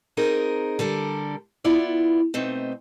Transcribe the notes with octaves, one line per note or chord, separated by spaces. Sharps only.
C4 D#4 G#4 A#4
D3 G3 A4 A#4
B3 E4 F4 D5
B2 A3 C4 D#4